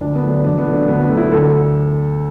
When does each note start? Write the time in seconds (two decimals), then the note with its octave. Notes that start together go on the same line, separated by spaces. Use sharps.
0.01 D2 D4
0.15 B3
0.23 D3 F#3 A3
0.30 D4
0.45 E2 D4
0.59 B3
0.66 B2 F#3 A3
0.73 D4
0.88 D2 B3
1.03 D4
1.09 D3 F#3 A3
1.17 E4
1.32 D2 A4